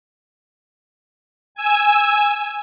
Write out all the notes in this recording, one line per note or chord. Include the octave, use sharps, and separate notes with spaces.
G#5 E6